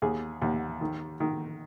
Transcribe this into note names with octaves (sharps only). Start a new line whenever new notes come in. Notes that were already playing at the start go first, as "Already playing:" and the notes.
D#2 G#4
D#2
D#3
D#3